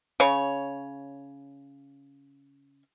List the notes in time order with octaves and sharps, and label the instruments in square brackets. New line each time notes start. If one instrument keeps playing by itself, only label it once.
[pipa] C#3 C#5